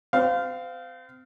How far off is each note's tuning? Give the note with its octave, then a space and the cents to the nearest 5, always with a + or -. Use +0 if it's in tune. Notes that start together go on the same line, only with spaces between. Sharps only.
C4 -35 F5 +0